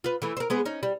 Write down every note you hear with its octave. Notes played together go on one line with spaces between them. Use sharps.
F4 B4
E3 A3
A#4 C5
G#3 B3 G#4
C#4 D#4
G3